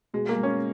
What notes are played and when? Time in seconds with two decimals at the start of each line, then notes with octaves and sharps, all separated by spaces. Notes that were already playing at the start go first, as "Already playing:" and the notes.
0.14 B2 G#3
0.29 A#3
0.36 G#3
0.43 C#4